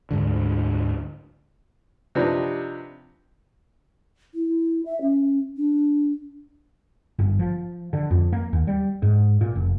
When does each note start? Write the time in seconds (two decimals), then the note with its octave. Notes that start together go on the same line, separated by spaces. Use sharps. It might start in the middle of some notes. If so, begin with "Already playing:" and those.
0.11 D2 G#2 D3
2.15 C3 F3 D4 D#4 G4 B4
4.34 E4
4.86 E5
5.01 C#4
5.57 D4
7.19 G1
7.39 F3
7.93 D3
8.11 F2
8.32 A#3
8.53 D#2
8.67 G3
9.02 G#2
9.41 A#2
9.56 F1